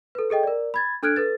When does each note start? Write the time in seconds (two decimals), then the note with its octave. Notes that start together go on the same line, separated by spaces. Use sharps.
0.15 A4 B4
0.30 G#4 A4 D#5 G5
0.43 A#4 D5
0.74 B5 G#6 A6
1.03 D4 A4 F6 F#6 G#6 D7
1.16 A4 B4 A6